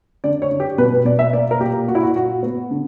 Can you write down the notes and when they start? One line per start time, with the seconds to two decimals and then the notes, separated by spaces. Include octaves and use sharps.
0.24 D3 D5
0.42 C#5
0.51 D3
0.60 G4
0.78 B2 B4
0.92 B4
1.05 B2 D5
1.19 E5
1.33 A#3 D5
1.51 A#4
1.60 A#2 G4
1.88 A#3 F#4
1.95 E4
2.03 F#4
2.16 A#2 F#4
2.43 B3
2.71 D3